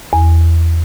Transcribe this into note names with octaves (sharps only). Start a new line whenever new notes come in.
E2